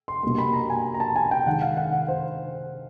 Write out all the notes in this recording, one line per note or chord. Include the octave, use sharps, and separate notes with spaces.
C6
B2 G3 A#3 C6
B5
A#5
G#5
A#5
A5
G#5
G5
D#3 G#3 F#5
F5
F#5
F#5
C5